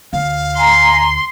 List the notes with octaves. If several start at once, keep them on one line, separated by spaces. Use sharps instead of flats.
D2 F5
G#5 A#5 C6